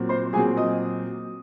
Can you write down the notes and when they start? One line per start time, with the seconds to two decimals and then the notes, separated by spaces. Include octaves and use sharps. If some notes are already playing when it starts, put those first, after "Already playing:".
Already playing: A#2 F#3 C4
0.09 C5 C6
0.33 A#2 F#3 C4 G#4 G#5
0.57 D#5 D#6